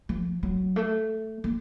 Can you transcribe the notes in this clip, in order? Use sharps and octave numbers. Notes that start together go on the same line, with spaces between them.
F3
F#3
A3
A#3